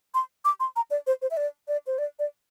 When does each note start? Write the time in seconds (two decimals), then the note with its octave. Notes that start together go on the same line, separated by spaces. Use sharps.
0.14 C6
0.45 D6
0.60 C6
0.76 A#5
0.91 D5
1.07 C5
1.22 C5
1.31 E5
1.37 D5
1.68 D5
1.87 C5
1.98 D5
2.19 D5